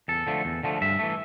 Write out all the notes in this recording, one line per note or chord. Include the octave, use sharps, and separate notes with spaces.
E2 A4
D3 F3 A3
E2
D3 F3 A3
G2 E5
E3 A3